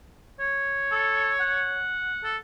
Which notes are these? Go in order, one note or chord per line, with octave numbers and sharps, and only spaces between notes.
C#5
A4
F#5
A4